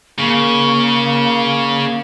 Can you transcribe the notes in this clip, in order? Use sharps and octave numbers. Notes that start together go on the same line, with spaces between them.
C#3 A#3